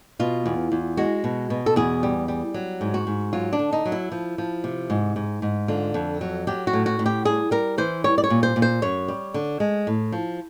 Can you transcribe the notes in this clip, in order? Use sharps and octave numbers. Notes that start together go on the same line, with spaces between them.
B2 F4
E2
E2
G#3 F#4
B2
B2
A4
E2 G#4
G3
G3
F#3
G#2
F#4
G#2
F#3 F4
D4
D3
D#4
F#3
E4
F3
F3
C3
G#2
G#2
G#2
D3 F4
F2
F#3
F#3 G4
F#4
A2
F#4
A2
G4
G3 G#4
G3 A#4
E3 C5
G3 C#5
D5
C#5
A#2
C5
A#2
C5
F#2 C#5
G3
D3
G#3
A2
F3